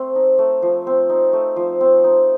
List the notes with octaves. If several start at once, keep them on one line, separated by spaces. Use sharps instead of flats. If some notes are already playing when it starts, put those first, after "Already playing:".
Already playing: A3 C4
D#4
A3
F3
C4
D#4
A3
F3
C4
D#4